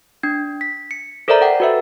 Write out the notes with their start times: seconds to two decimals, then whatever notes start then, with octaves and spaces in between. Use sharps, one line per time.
0.23 D4 G#6
0.61 B6
0.91 C#7
1.28 A4 A#4 C5 D5 E5 A#5
1.41 A4 F#5 G5
1.60 F#4 B4 E5